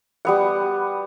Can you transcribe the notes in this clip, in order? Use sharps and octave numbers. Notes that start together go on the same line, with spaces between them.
G3 B3 F#5